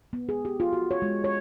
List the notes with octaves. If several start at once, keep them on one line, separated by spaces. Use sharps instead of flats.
B3
G#4
G4
F4
F#4
C#5
G#3
C#5